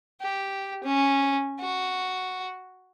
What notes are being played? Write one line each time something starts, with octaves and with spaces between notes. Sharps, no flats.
G4
C#4
F#4